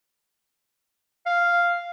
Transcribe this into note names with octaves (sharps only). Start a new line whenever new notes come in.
F5